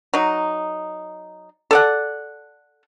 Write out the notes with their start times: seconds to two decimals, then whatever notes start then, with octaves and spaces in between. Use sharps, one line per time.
0.14 F#3 D#4
1.71 A4 D5 F#5